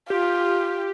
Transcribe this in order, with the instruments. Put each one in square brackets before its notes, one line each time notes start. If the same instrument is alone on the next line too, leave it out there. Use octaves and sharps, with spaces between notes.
[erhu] F4 [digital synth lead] G4